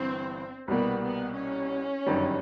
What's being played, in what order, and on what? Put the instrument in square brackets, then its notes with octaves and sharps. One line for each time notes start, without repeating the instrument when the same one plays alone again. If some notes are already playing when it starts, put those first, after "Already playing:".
Already playing: [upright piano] G1 G2 E3 [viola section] C4
[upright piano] C2 B2 G3 A#3 [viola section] B3
[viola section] B3
C#4
[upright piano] G1 F#2 D#3 G3